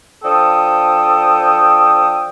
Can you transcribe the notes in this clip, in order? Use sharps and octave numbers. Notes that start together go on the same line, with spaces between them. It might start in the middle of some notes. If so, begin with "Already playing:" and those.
F3 D4 A4 G5 D#6